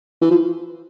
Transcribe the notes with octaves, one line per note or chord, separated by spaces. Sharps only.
E3
F3